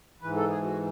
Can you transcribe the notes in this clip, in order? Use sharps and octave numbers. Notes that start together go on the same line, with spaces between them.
G#2 E3 B4
A4
G#4
F#4